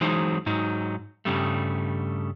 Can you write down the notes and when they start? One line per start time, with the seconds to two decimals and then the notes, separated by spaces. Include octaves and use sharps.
0.01 E3 F#3 G#3 D#4 C5
0.46 G#2 F#3 D#4
1.25 G2 C#3 G3 A3